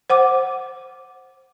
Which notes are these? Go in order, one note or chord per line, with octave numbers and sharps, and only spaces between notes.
C5 F#5 D6